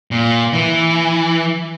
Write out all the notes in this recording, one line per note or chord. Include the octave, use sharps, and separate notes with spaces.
A#2
E3